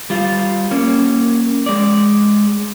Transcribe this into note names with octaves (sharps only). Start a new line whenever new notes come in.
G3 F4
A#3 C#4
G#3 D5